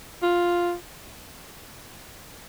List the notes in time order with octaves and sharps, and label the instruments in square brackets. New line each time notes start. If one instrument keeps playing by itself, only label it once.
[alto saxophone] F4